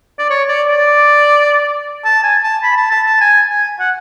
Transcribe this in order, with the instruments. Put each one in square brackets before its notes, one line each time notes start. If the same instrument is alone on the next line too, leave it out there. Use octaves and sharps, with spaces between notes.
[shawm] D5
C#5
D5
D5
A5
G#5
A5
B5
A5
A5
A5
G#5
G#5
F#5